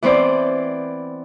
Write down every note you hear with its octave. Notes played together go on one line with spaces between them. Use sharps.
E3 B3 C4 C5 D5